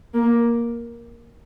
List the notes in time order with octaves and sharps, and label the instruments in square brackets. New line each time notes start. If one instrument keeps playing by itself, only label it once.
[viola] A#3